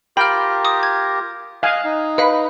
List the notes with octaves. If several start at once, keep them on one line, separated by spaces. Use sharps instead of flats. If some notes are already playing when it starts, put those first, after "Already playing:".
F4 G4 A#4 G5 B5 F6
D6 D#6
G#6
D#5 F5 G#5 F#6
D#4
B4 D#5 F5 B5